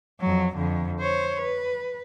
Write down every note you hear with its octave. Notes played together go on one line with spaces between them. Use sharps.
F2 F#3
F2 D3
C5 C#5
B4